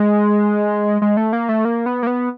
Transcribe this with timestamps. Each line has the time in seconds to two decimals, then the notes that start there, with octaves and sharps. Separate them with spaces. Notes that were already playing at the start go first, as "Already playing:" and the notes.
Already playing: G#3
1.02 G#3
1.17 A3
1.33 A#3
1.49 A3
1.65 A#3
1.86 B3
2.03 A#3
2.07 B3